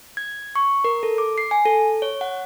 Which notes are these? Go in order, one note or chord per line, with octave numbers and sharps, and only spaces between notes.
G#6
C#6
A#4
A4
D6
C7
G#5
A4
C#5
F#5